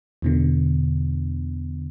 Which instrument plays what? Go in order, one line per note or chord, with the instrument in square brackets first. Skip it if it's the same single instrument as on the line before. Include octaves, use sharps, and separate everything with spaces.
[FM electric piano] E2 B2 D3